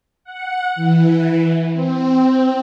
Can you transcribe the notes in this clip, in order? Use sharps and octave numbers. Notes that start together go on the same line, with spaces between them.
F#5
E3
C4